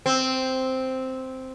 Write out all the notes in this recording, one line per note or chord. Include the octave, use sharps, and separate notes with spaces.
C4